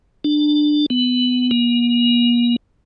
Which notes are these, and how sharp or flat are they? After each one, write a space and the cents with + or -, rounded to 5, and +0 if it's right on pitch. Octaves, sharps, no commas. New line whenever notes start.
D4 +20
B3 +15
A#3 +45